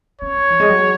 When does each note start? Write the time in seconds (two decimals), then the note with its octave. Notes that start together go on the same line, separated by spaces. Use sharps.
0.21 C#4 C#5
0.36 F#3
0.50 E3
0.60 G#3
0.69 F#3